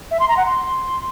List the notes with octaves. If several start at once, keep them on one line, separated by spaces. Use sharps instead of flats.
E5
C6
A#5
F#5
C6